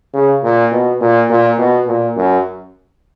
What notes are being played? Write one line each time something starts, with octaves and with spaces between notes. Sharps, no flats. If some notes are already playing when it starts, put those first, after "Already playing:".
C#3
A#2
B2
A#2
A#2
B2
A#2
F#2